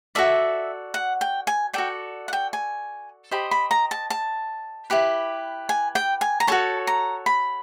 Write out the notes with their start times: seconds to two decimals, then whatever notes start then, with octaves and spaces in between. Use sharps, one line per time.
0.15 F#4 A4 D5 E5
0.94 F#5
1.21 G5
1.47 G#5
1.73 F#4 A4 D5 G5
2.28 F#5
2.33 G5
2.53 G#5
3.31 G4 C5 D#5 B5
3.51 B5
3.71 A#5
3.91 A5
4.10 A5
4.90 E4 G4 B4
5.69 G#5
5.95 G5
6.21 G#5
6.40 A#5
6.47 F#4 A4 C#5 A5
6.87 A#5
7.26 B5